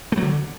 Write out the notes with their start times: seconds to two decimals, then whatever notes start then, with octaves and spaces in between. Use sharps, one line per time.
0.12 A3
0.17 F#3
0.23 D3